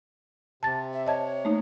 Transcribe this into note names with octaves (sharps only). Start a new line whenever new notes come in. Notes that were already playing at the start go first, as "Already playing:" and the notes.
C3 A5 A6
E5
C#5 D#5 A5 G#6
A3 A#3 D#4